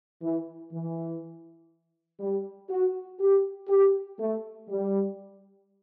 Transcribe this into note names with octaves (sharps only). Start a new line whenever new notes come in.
E3
E3
G3
F#4
G4
G4
A3
G3